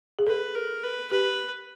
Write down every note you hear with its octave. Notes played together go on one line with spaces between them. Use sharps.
G#4
A4 B4
A#4
B4
G4 B4